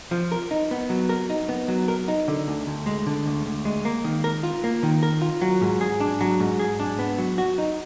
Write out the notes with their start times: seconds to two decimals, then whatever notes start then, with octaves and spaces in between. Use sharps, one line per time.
0.11 F3
0.32 A#4
0.51 D#4
0.71 B3
0.90 F#3
1.09 A#4
1.30 D#4
1.49 B3
1.68 F#3
1.88 A#4
2.08 D#4
2.28 D3
2.48 D2
2.67 D2
2.86 G#3
3.06 D3
3.26 D2
3.46 D2
3.65 G#3
3.85 A#3
4.04 D#3
4.24 A#4
4.43 F4
4.64 A#3
4.83 D#3
5.03 A#4
5.21 F4
5.42 F#3
5.61 G#2
5.81 G#4
6.00 D4
6.21 F#3
6.40 G#2
6.59 G#4
6.80 D4
6.99 B3
7.18 F#3
7.38 F#4
7.58 D#4